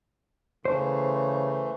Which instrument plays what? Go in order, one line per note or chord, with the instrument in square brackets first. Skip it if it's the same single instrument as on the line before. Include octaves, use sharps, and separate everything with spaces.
[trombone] C#3 [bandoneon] E3 A3 [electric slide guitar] C5